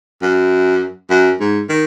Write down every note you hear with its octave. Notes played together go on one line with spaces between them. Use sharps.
F#2
F#2
G#2
D#3